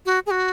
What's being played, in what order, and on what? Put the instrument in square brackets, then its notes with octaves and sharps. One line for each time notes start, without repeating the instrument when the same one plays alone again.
[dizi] F#4
G#4
F#4